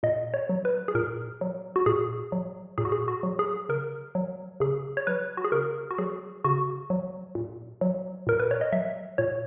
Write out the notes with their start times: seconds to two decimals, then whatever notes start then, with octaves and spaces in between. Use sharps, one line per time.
0.03 A#2 D#5
0.34 C#5
0.49 F#3
0.65 B4
0.88 G#4
0.95 A#2 A#4
1.41 F#3
1.76 F#4
1.86 A#2 G#4
2.32 F#3
2.78 A#2 G#4
2.85 F#4
2.92 G#4
3.08 F#4
3.23 F#3
3.39 G#4
3.69 C#3 A#4
4.15 F#3
4.60 C#3 G#4
4.97 C#5
5.07 F#3 B4
5.37 F#4
5.44 G#4
5.52 C#3 A#4
5.91 F#4
5.98 F#3 G#4
6.44 C#3 F#4
6.90 F#3
7.35 A#2
7.81 F#3
8.27 A#2 A#4
8.40 B4
8.51 C#5
8.61 D#5
8.72 F#3 E5
9.18 A#2 C#5